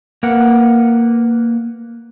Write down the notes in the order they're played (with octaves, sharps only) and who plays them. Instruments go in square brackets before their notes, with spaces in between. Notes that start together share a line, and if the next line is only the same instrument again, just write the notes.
[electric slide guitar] A#3 A#4 B4 F#5